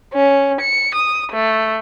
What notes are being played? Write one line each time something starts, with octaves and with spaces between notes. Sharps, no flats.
C#4
C#7
D#6
A3